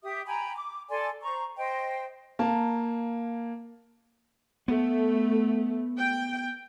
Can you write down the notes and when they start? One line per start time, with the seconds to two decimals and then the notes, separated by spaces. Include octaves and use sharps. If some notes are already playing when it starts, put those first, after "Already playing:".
0.03 G4 E5 D#6
0.26 G5 G#5 A#5 B5
0.56 D6
0.89 A4 D5 G#5 C6
1.22 C5 A#5 C#6
1.57 C5 D#5 G5
2.39 A#3 A5
4.68 A3 B3
5.98 G5